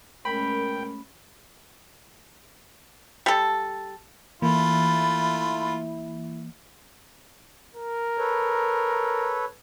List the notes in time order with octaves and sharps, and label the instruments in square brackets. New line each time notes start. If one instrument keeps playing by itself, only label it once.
[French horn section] B2 A#4 [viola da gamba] G#3 A3 C#4 [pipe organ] G5 [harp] B5
[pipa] G3 A4
[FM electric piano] E3 A#3 [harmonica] A3 F4 [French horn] E4 [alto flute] B5
[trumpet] A#4
[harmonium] A4 B4 C#5